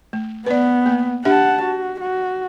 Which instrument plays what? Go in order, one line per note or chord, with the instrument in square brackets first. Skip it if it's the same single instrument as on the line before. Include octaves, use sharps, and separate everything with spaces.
[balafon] A3
[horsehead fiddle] B3 [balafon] B4 D5
[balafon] A#3
[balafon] D4 G4 E5 [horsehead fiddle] F#5 A5
[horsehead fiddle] F#4
F#4